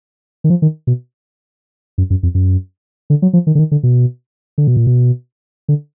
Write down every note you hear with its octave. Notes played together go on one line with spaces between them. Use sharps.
D#3
F3
D#3
B2
F#2
F#2
F2
F#2
D3
F#3
F3
D#3
D3
D#3
D3
B2
D3
B2
A#2
B2
D3